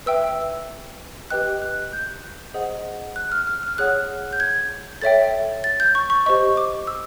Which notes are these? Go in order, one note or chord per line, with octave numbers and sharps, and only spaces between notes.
B4 E5 G5 E6
G4 B4 D#5 G5 F#6
F#6
G6
G#4 C5 D#5 F#5
F#6
F6
F6
F6
G#4 C#5 F#5 F#6
G6
G#6
A4 C#5 E5 G5 A6
A6
G6
C#6
C#6
G4 C5 D#5 C#6
D6
E6